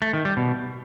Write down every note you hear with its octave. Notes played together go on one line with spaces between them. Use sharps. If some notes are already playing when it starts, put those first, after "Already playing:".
A3
D#3
G3
B2